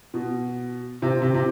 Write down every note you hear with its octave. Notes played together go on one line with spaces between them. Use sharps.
B2
C3
C3
C3